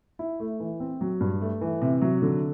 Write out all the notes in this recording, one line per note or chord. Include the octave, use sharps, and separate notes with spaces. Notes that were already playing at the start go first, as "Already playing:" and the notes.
E4
A3
E3
C4
F#3
G2
A3
E3
C3
F#3
D3